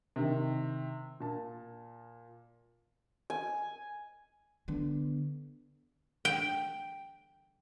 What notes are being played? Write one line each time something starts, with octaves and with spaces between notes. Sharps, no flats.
C3 D#3
A#2 A5
G#5
D3 B3
G5